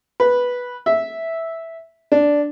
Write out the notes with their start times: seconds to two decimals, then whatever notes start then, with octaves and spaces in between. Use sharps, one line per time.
0.20 B4
0.86 E5
2.12 D4